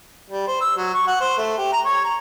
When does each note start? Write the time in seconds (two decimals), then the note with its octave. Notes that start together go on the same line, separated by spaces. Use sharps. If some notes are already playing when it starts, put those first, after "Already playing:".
0.31 G3
0.47 C5
0.61 E6
0.77 F#3
0.94 C#6
1.07 F#5
1.21 C5
1.37 A3
1.58 G4
1.72 A#5
1.85 C#5
2.04 A#5